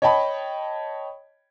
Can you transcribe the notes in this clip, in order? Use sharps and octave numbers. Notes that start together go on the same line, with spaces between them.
C#5 D#5 G5 A5 B5